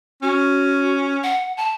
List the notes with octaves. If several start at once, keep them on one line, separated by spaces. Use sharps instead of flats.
C#4 F#4
F#5
A5